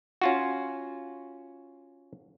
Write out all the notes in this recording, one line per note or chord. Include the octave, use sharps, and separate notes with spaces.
C#4 F4 F#4